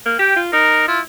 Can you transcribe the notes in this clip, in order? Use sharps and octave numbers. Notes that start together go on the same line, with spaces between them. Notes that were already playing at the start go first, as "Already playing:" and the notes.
A#3
G4 G5
F4
D#4 A#4
E4 F4